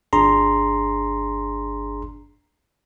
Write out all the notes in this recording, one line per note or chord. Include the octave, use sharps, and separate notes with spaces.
G1 D4 G#4 A#5 C6